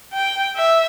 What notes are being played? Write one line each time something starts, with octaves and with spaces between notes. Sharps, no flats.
G5
E5